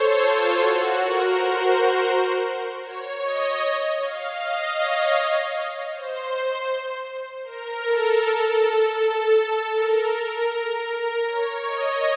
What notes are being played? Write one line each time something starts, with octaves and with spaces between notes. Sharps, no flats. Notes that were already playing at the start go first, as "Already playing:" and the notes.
Already playing: A4 C5 C#5
F4
F#4
A#4
C5
C#5
D#5
F5
D#5
C#5
C5
A#4
A4
A#4
C#5
D#5